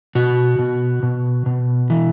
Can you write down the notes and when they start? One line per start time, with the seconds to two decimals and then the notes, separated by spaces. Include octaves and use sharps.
0.15 B2 F#4
0.59 B2
1.03 B2
1.46 B2
1.90 E3